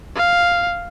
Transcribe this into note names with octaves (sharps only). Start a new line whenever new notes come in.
F5